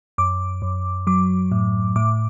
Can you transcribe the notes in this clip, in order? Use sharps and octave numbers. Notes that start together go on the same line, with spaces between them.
F#2 D6
F#2
F#3 D6
A2
A2 D6